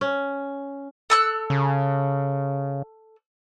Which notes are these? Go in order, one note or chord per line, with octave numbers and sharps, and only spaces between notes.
C#4
A4 E6 F#6
C#3